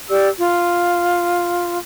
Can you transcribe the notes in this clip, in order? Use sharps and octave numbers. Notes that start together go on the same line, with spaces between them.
G4 D5 E6
F4